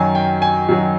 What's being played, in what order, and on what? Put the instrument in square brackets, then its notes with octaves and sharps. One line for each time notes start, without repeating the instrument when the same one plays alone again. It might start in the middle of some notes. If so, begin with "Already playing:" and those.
Already playing: [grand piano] F#2 D#3 F#3 G#5
G5
G#5
F#2 D#3 F#3